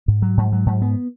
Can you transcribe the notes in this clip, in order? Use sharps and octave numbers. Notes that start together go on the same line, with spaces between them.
G#2
F#3
G#2
F#3
G#2
B3